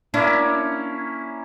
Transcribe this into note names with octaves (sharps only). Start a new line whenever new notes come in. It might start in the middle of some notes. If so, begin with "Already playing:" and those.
A#3 C#4 D4 E4